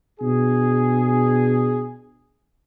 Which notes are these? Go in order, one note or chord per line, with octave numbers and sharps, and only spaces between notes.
B2 D4 G#4